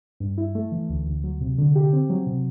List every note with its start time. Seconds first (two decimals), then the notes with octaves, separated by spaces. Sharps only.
0.20 G2
0.38 E4
0.55 A3
0.72 E3
0.89 D2
1.06 D2
1.24 F#3
1.41 C3
1.58 D3
1.75 G4
1.93 C4
2.10 F#3
2.26 C3